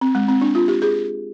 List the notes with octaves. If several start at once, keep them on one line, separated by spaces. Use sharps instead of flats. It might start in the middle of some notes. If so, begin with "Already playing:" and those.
C4
G#3
C4
D4
F4
G4
G#4